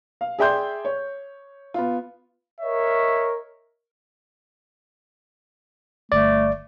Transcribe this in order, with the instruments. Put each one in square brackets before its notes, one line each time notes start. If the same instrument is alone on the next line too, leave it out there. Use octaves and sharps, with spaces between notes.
[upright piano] F5
G#4 D5 E5 G5 C6 G6
C#5
B3 F4
[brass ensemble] A#4 C#5 D#5 E5
[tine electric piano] G1 D5 [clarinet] A3